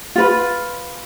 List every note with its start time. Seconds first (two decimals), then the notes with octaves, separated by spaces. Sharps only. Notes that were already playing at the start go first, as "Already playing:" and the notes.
0.16 F4 B4